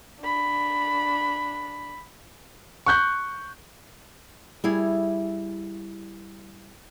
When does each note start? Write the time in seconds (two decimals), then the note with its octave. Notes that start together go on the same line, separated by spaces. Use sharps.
0.20 D4 B5
2.86 C#6 F#6 G6
4.64 G3 E4 G#4